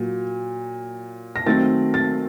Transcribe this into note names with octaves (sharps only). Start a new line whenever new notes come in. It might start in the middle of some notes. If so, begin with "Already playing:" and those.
Already playing: A#2 F#3
A#6
D#3 F#3 A3 C4 A6
A6